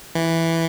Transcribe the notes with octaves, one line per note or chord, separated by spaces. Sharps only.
E3